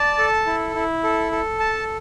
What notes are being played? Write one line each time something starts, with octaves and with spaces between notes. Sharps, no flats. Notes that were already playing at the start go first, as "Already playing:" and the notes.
Already playing: D5 A5
A4
E4
E4
A4
A4
A5